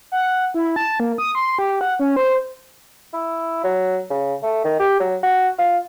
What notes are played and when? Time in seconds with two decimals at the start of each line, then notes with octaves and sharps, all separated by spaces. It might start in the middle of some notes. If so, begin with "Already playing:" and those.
0.12 F#5
0.54 E4
0.76 A5
1.00 A#3
1.18 D#6
1.35 C6
1.59 G4
1.81 F#5
2.00 C#4
2.16 C5
3.13 E4
3.64 F#3
4.10 C#3
4.43 A3
4.64 D#3
4.79 G4
5.00 F#3
5.23 F#4
5.59 F4